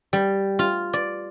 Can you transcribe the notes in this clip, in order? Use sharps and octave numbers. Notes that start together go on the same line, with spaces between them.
G3
F4
D5